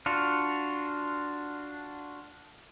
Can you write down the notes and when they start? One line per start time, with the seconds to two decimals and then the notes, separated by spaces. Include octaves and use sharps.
0.06 D4 F4 F#4